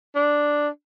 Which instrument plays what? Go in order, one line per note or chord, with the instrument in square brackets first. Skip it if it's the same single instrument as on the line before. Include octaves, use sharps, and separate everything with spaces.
[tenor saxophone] D4